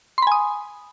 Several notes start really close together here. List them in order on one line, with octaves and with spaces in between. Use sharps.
C6 B5 G#5 D#6